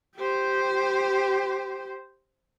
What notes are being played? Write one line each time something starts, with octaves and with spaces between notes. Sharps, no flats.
G4 C5